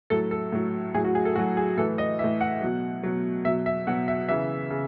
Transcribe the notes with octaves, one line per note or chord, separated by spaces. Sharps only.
A2 F#3 A4
A4
A2 F#3
A2 F#3 G#4
F#4
G#4
A4
A2 F#3 F#4
G#4
A2 E3 A4
D#5
A2 E3 E5
F#5
B2 F#3
B2 F#3
B2 F#3 E5
E5
B2 F#3 F#5
E5
C#3 E3 E5
C#3